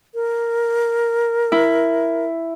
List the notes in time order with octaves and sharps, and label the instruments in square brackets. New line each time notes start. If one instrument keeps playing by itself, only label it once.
[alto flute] A#4
[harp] E4